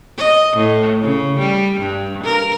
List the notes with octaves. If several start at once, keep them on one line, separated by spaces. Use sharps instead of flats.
D#5
A2
C#3
G3
G2
A#4